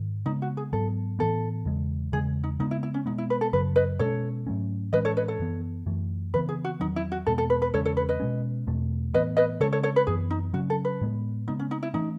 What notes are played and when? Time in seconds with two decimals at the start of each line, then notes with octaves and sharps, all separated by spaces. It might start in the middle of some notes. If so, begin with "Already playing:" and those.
Already playing: G#2 D#3
0.26 C#3 G#3 B3 D#4
0.42 F#4
0.57 G#4
0.73 G#2 F#3 B3 A4
1.19 A2 E3 B3 A4
1.65 E2 C#3 G#3
2.12 E2 C#3 G#3 G#4
2.44 D#4
2.59 C#3 G#3 B3 D#4
2.71 E4
2.83 E4
2.94 C#4
3.06 B2 G#3 B3 D#4
3.18 E4
3.30 B4
3.41 A4
3.53 F#2 C#3 F#3 B4
3.76 B4 D#5
3.99 B2 G#3 C#4 A4 C#5
4.47 G#2 F#3 A3 C#4
4.93 A2 E3 G#3 C#4 B4 D#5
5.05 A4 C#5
5.17 B4 D#5
5.28 A4 C#5
5.40 F#2 E3 B3
5.86 F#2 E3 A3
6.34 C#3 E3 B3 B4
6.49 G#4
6.64 F#4
6.80 E2 D#3 F#3 D#4
6.96 E4
7.12 F#4
7.27 E2 B2 G#3 B3 A4
7.38 A4
7.50 B4
7.62 B4
7.74 E2 C#3 G#3 C#4 A4 C#5
7.85 A4 C#5
7.97 B4
8.09 B4 D#5
8.20 B2 G#3 C#4
8.67 E2 B2 A3
9.14 A2 E3 B3 B4 D#5
9.37 B4 D#5
9.60 C#3 G#3 C#4 A4 C#5
9.72 A4 C#5
9.83 A4 C#5
9.96 B4
10.07 F#2 E3 B3 G#4
10.30 D#4
10.53 C#3 F#3 C#4 F#4
10.70 A4
10.85 B4
11.01 A2 G#3 B3
11.48 C#3 G#3 B3 D#4
11.59 C#4
11.71 D#4
11.83 E4
11.94 E3 A3 C#4 D#4